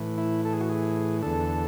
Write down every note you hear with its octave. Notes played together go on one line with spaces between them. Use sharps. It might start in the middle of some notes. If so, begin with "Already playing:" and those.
Already playing: A2 E3
E4
A4
G#4
F#4
G#4
E2 D3 A4